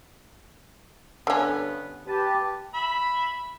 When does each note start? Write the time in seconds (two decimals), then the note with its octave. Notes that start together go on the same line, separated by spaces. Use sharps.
1.27 G2 D3 B3 C#4
2.07 G4 B4 A5
2.74 E5 B5